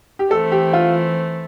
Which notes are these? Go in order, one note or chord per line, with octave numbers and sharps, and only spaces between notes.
G4
E3 A3 C4 A4
G4
F4